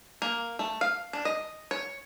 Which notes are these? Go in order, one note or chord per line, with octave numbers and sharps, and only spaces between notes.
A#3
A3
F5
D4
D#5
C#5